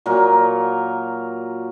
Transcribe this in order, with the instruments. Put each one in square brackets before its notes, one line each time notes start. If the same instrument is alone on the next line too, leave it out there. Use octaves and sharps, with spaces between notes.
[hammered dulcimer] A#2 F#3 A#4